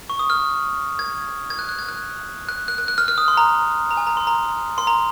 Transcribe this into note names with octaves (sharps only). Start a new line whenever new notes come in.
C#6
D#6
F6
G#6
G#6
F#6
F#6
G#6
F#6
F#6
F#6
F#6
F#6
F6
F6
D#6
C6
A#5
A#5
G#5
A#5
C6
A#5
C6
A#5